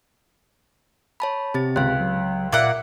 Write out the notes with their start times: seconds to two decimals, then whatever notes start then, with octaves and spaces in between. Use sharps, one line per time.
1.20 C#5 A5 B5
1.54 C3 C4 G4 A6
1.76 C#2 F5 F#6
2.00 F#3
2.53 A#2 A#3 D5 E5 F#5